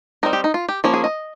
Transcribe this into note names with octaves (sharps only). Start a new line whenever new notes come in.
G3 C4 D#4 A#4
G4
D#4
F4
G4
F3 A#3 C#4
G#4
D#5